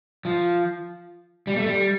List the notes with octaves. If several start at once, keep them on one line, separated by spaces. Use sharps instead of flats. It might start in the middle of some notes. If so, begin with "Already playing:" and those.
F3
G3
A3
G3